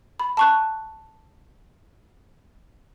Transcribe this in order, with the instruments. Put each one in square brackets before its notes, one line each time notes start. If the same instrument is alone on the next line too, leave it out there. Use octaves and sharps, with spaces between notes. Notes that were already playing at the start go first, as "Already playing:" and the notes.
[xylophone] B5
A5 C#6 F#6